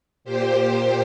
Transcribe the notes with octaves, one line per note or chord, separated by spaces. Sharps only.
A#2 G4 C5